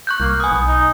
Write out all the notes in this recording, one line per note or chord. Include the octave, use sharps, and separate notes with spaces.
C#6 F#6 G6
C2 A#3
B3 G#5 D#6
B1
D#4